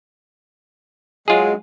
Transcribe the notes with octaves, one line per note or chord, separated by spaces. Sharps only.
F#3 G#3 F4 G#4